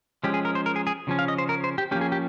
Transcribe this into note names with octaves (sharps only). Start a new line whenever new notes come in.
F3 G#3 C#4 G4
G#4
A#4
C5
A#4
G#4
G#4
C#3 F3 C#4
F5
D#5
C5
A#4
C5
G4
F3 A#3 C#4 G4
G#4
G4